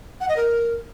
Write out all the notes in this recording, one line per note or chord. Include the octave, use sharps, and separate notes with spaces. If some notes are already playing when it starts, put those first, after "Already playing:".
F#5
D#5
A#4